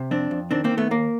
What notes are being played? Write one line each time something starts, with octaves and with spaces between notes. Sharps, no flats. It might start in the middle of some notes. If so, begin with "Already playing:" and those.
Already playing: C3
F2 C4 D4
F2
D#3 C4 D4
A#3 C4
D#3
A3 B3
D#2 A#3